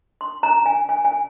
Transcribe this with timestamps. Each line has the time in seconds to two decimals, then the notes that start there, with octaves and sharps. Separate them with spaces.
0.21 C6
0.43 A#5
0.66 G#5
0.89 G#5
1.05 G#5